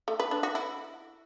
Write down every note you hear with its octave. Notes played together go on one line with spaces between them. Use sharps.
A3
B4
D4
F#4
E4